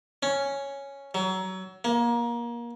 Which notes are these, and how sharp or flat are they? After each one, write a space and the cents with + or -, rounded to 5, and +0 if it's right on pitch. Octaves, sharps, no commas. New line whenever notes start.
C#4 +0
F#3 +25
A#3 +25